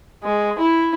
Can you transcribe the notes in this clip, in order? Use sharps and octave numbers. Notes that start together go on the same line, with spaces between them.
G#3
E4